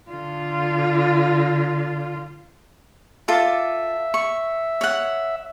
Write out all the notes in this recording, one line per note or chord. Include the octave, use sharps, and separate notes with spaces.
D3 F4
F4 A4 E5 D6
C#6
C#5 F#5